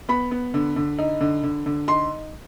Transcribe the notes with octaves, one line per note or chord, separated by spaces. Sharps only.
B3 B5
B3
D3
D3
D#4
D3
D3
D3
D#4 C6